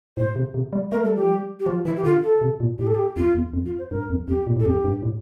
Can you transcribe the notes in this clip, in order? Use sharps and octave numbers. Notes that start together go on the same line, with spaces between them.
A2 C5
C3
C3
G3
A3 A#4
G3 A4
F3 G4
G3
G4
F3 F4
E3 E4
G4
D3 F4
A4
C3
A#2
A2 G4
A4
G4
F2 F4
E2
F2
F4
C5
G2 A#4
F2
F2 G4
A#2
A2
A4
F2 G4
G2
A2